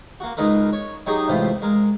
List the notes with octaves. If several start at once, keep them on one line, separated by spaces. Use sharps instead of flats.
A#3 F#4
C#2 G#3 D#4 A#4 B4
C#5
F#3 D#4 G4 G#4 C#6 D#6
C#2 A2 C3 E3 F4 C5
G#3 A#4